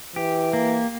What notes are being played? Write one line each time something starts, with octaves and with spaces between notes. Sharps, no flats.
E3 G4
A#3